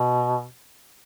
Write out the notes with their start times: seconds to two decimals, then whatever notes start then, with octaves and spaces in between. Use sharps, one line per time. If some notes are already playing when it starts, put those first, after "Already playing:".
Already playing: B2